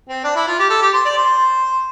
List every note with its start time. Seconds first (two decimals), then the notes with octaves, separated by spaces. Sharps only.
0.09 C4
0.24 D4
0.36 E4
0.48 F4
0.59 G4
0.70 A4
0.82 G4
0.94 C5
1.05 D5
1.17 C5